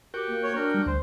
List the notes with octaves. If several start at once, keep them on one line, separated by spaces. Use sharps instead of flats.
F#4 G4 A#4 G5
A#3
C#5
D4 A#4
G3 F6
D2 C5